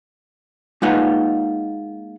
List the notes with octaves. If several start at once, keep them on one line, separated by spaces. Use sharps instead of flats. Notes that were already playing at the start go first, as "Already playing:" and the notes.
G#3 A#3 D#4 F4 B4 F#5